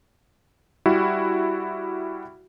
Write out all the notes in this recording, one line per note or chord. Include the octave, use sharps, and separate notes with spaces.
G3 E4 F#4